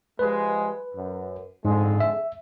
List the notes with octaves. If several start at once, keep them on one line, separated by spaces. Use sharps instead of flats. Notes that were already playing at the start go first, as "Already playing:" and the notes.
F3 G3 G#3 B4
F#2
F2 G#2 D3 G#3
E5